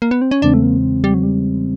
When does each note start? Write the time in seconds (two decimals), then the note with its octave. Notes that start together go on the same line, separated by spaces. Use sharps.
0.02 A#3
0.11 B3
0.21 C4
0.31 C#4
0.42 E2 C#3 E3 G#3 C4 D4
0.54 A3
0.63 A#3
1.04 G3
1.14 F#3
1.23 G3